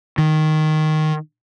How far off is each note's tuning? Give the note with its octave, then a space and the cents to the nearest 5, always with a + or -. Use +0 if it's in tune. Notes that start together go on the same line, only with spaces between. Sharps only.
D#3 -5